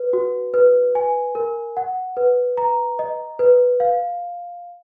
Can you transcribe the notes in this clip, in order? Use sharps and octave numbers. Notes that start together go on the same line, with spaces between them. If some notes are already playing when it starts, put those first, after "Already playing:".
Already playing: B4
F#4
B4
G#5
A#4
F#5
B4
A#5
D#5
B4
F5